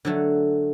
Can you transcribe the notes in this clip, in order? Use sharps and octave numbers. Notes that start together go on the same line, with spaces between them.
D3 F#3 A3